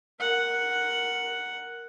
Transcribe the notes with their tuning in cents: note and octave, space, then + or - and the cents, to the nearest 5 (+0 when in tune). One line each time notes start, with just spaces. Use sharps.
A#4 +5 F#5 +0